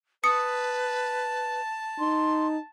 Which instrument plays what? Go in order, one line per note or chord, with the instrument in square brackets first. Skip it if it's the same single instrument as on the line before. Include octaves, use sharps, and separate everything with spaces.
[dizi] B4 [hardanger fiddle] A5 [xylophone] D#6 C#7
[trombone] D#4 [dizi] C6